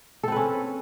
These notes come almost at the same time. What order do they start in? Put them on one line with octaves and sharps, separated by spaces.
A4 C4 B4 C#4